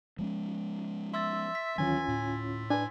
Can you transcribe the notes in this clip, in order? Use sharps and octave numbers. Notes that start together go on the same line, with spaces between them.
F3 G#3 C#4
E5 C6 E6 A6
B6
D2 D#3 E3 F#3 C#4 F4 G#5
A2
D4 B4 G#5